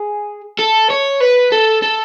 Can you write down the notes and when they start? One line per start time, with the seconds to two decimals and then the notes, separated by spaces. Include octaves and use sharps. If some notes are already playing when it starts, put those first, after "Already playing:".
Already playing: G#4
0.59 A4
0.90 C#5
1.21 B4
1.52 A4
1.82 A4